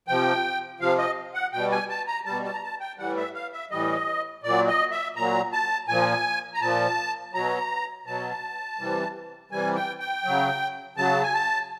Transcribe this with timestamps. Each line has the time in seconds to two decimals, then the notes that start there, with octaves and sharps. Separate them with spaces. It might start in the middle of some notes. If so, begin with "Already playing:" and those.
0.07 C3 F3 G5
0.80 C3 F3 F5
0.98 D#5
1.34 F#5
1.53 B2 G3 G5
1.72 G#5
1.89 A5
2.07 A#5
2.25 B2 G3 A5
2.44 A5
2.53 A#5
2.62 A5
2.80 G5
2.98 A2 E3 G3 F#5
3.16 E5
3.34 F5
3.53 E5
3.71 A2 E3 G3 D#5
4.43 A#2 D5
4.48 F#3
4.67 D#5
4.91 E5
5.16 A#2 F#3 A#5
5.52 A5
5.88 A#2 F3 G#5
6.54 A#5
6.61 A#2 F3 A5
7.33 B2 F#3 A#5
8.06 B2 F#3 A5
8.79 C3 E3 G3
9.51 C3 E3 G3 G#5
9.76 G5
10.00 G5
10.24 C#3 F#3
10.97 C#3 F#3 A5
11.23 G#5
11.34 A5